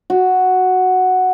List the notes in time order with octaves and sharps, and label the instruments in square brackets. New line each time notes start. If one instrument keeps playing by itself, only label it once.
[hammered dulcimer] F#4